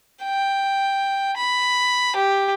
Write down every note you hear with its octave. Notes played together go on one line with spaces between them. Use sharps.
G5
B5
G4